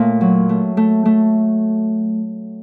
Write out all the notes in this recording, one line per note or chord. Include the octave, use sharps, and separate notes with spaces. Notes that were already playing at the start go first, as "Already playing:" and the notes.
Already playing: A#2 A3 C#4
F#3
A3
A3
A3